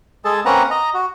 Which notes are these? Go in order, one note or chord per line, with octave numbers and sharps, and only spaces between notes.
G#3 G#4 A4 A5
A#3 C4 C#4 B4 F#5 A#5
D#5 A#5
F#4